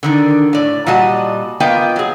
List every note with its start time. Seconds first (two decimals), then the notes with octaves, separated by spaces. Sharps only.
0.03 D3 D#3 D4
0.53 A2 D5
0.87 A#2 G3 F#4 D#5 A5
1.60 A#3 B3 F4 D#5 G5
1.96 F#3 G#4